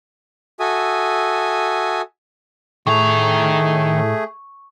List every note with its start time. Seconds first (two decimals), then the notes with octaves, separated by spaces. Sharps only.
0.60 F#4 A4 E5 G#5 D#6
2.87 A2 D#3 A3 G#4 A#5 C#6